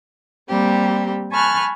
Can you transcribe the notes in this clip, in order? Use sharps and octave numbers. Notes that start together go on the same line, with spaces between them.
G3 A#3 C4 G4
G#5 A5 B5 C#6 F6 F#6